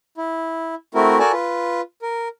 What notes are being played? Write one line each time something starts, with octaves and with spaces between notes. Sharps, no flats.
E4
A3 C4 E4 F#4 A#4
F#4 A4 A#4 D5 G#5 A5
F4 B4
A#4